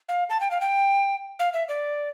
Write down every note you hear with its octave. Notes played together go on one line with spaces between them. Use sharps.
F5
A5
G5
F5
G5
F5
E5
D5